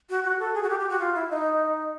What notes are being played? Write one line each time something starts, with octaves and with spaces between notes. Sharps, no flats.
F#4
F#4
A4
G#4
F#4
G4
G4
F#4
F4
E4
D#4